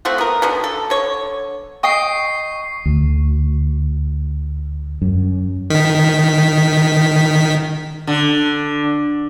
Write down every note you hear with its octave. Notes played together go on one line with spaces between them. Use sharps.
A3 C4 F4 F#4
B3 A#4
B2 D3 D#3
A4
D3 C#5
D#5 G5 C#6 D#6 C7
D2
F#2
D#3 B6
D3